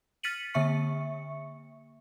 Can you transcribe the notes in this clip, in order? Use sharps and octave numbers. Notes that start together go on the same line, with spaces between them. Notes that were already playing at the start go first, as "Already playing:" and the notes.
F6 A6 B6 C#7 D#7 F#7
D3 A#3 E5 C#6 C#7